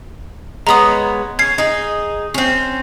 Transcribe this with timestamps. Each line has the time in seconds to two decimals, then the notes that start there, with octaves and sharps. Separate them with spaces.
0.67 G#3 B3 C#5 A#5 D#6
1.39 C#4 G#6 C7
1.58 D#4 G#4
2.34 C4 C#4